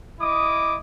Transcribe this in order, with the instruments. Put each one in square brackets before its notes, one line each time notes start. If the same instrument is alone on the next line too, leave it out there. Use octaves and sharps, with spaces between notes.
[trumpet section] E4 D#5 D6 D#6